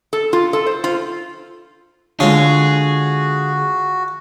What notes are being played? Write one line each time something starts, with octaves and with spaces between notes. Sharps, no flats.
A4
F4
A4
C5
F4
D3 G#3 F4 F#4 G#4 C#5